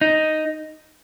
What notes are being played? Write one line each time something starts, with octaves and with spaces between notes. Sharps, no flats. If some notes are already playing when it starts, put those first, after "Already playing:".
D#4